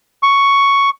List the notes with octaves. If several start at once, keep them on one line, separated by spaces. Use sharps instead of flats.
C#6